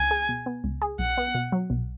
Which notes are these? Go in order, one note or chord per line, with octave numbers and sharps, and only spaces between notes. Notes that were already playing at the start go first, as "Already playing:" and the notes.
Already playing: C#2 G#5
G#4
B2
B3
C#2
G#4
B1 F#5
B3
B2
F#3
B1